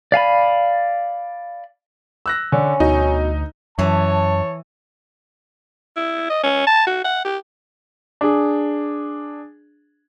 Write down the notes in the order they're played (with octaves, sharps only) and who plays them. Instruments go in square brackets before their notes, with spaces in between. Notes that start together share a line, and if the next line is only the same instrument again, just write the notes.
[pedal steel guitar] D5 F5 G#5 B5
[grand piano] E6 F#6 A#6
[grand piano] D3 [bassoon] C#4
[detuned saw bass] D2 [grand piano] B2 [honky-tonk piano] D#4
[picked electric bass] F#2 [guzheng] E3 B5 [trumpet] C#5 [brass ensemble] A5
[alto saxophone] E4
D#5
C#4
A5
F#4
F#5
G4
[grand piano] D4 G#4